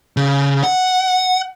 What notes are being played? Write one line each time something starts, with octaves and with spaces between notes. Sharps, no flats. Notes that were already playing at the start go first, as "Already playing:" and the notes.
C#3
F#5